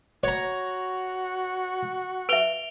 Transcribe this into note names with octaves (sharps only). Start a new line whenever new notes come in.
F#4 C#5 A#5
B4 E5 D7 F7 G7